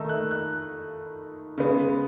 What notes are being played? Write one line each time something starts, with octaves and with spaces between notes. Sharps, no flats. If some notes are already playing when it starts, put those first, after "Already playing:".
Already playing: D#3 A3 D#4 E6
F#6
F#6
C#3 G#3 B3